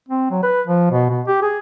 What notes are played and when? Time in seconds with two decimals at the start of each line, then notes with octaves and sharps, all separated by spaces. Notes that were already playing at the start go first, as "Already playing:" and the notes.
0.09 C4
0.31 F#3
0.43 B4
0.67 F3
0.92 B2
1.10 B2
1.27 G4
1.42 G#4